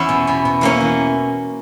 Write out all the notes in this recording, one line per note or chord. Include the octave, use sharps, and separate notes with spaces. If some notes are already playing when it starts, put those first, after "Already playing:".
Already playing: E2 C#4 E4
B2
B2
B2
E3 A#3 C#4
E3